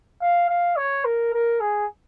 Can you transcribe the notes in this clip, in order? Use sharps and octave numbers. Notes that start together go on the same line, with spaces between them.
F5
F5
C#5
A#4
A#4
G#4